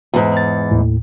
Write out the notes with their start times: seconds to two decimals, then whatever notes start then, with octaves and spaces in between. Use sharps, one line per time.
0.14 E2 G#2
0.37 A6
0.71 D#2 A2